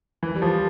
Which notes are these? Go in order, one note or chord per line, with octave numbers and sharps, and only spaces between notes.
E3
G3
F3